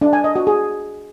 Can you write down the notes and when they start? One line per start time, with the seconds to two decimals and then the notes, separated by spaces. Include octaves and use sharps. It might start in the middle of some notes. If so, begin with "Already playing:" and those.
0.02 D4
0.13 G#5
0.24 D#5
0.36 F#4
0.47 G#4